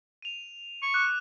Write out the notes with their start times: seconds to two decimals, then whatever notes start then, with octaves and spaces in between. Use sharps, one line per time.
0.22 D#7 F7
0.83 C#6
0.94 D6 F#6